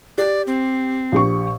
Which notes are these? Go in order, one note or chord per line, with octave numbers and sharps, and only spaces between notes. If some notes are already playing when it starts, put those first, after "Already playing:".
G4 D5
C4
A#1 G4 C#6